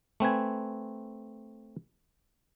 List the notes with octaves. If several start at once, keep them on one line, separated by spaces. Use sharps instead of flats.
A3 C4 B4 G#5